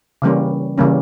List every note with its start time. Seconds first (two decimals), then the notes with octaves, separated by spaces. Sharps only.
0.22 C#3 E3 G3 A#3 C#4
0.78 C#3 E3 G3 A#3 C#4